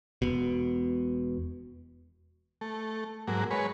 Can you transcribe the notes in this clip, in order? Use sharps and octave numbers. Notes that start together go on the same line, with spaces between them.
E1 B2
A3
G#2 F#3 A#3
G#3 B4 C#5